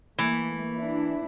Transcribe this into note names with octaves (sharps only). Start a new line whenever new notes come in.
E3 A3 A#3
D4 E4